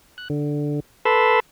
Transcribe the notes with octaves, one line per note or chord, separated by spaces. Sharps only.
F#6
D3
A4 B4 A5 B5 C6 E6